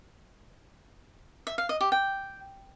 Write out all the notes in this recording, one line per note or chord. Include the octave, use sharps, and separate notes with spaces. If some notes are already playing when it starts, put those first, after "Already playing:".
E5
F5
D#5
G4
G5